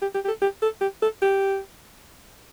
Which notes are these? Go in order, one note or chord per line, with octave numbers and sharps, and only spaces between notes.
G4
G4
G4
A4
G4
A4
G4
A4
G4